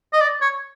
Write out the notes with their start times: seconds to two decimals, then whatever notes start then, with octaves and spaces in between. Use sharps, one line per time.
0.13 D#5
0.21 D5
0.42 C#5